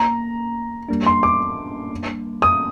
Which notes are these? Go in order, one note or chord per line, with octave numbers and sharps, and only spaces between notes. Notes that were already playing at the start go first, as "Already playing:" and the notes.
Already playing: A#3 A#5
G3 A#3 D4
C6
D6
D#6